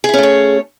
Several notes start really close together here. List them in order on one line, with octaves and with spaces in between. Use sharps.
G#4 E4 C#4 A3 C#5